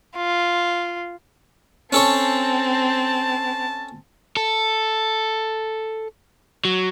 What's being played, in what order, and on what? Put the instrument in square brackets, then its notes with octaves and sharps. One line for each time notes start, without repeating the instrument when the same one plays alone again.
[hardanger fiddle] F4
[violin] C4 [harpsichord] C#4 A4 C#5 [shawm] A5
[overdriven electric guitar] A4
F#3